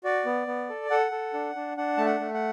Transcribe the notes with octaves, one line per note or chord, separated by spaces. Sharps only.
F#4 D5
B3
B3
A4
A4 F#5
A4
D4
D4
D4 F#5
A3 A5
F#5
A3
F#5